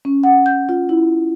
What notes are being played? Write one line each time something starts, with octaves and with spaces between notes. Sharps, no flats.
C#4
F#5
G6
F4
E4